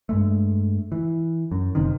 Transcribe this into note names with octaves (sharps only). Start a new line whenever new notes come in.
G2 G#3 A3
E3
F#2
F#1 C3 D#3